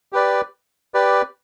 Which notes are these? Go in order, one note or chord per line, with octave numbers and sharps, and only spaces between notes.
G4 B4 D5
G4 B4 D5